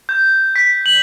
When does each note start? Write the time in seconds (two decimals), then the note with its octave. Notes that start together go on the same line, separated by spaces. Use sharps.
0.09 G6
0.56 B6
0.86 F#7